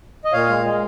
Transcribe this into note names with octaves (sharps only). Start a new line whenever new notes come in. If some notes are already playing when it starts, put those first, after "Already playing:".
D#5
A#2 C#5 F5
G#3
G#3